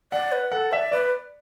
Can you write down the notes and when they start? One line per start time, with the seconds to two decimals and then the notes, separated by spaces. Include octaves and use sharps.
0.12 D5 F#5
0.32 B4
0.52 A4 F#5
0.72 D5 E5
0.92 B4 D5